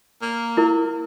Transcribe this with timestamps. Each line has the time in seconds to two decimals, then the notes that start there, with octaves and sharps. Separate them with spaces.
0.22 A#3
0.57 E4 A#4